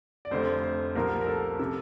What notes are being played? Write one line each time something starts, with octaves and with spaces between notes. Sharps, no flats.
D5
F1 F2 D3 A3 C5
C5
C2 A#2 F3 A#3 A#4
A#4
A4
C3 A4